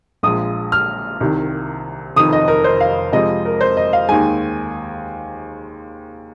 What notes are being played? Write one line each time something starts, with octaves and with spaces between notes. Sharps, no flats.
A#1 A#2 F3 G#3 D#6
F6
C2 C3 D#3
F1 F2 D#3 D#6
D#5
A#4
C5
F5
F2 C3 F3 G#3 D#5
A#4
C5
D#5
F5
D#2 D#3 G#3 G#5